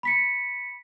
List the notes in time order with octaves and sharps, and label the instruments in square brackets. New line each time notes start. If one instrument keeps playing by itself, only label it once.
[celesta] B5 B6 C#7